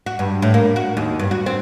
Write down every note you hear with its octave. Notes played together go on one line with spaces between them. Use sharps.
F#4
G2
A2
A#3
F#4
D#2
G2
F#4
C4